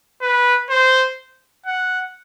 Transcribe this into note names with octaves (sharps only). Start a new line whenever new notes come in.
B4
C5
F#5